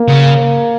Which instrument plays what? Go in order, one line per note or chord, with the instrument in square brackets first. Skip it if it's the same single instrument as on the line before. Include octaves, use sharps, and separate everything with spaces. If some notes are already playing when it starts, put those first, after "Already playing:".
Already playing: [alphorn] A#3
[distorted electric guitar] C#3